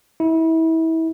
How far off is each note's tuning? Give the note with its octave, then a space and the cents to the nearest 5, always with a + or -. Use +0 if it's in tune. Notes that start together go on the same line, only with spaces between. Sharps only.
E4 -30